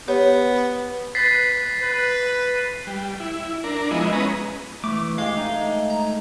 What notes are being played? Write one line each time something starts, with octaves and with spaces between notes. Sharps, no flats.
B3 G4 C#5
B4 A6 B6 C7
B4
G3
E4
D4 A#4
F3 G#3 B3 E4 D#5
G#3 B3 C#4 B4 A#5 D#6
E3 A3 D6
G#3 G4 F5
G#3 A3 D#4
A#5